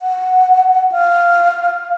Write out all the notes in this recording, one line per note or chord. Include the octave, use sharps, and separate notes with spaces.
F#5
F5